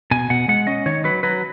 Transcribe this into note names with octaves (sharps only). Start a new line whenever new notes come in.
B2 G#5
B2 F#5
G#3 F#5
C#4 D#5
D#3 C#5
F#3 B4
F#3 B4